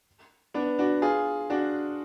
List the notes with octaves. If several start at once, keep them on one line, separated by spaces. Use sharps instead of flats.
B3 D4
D4 F#4
F4 G#4
D4 F#4